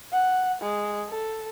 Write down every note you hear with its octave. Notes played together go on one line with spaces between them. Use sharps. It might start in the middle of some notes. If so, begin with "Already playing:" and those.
F#5
G#3
A4